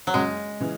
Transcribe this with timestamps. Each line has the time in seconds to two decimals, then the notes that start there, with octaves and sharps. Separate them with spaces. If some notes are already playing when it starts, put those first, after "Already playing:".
0.07 F#3
0.14 F#1 F#2 C#3 G#3
0.60 C#3 E3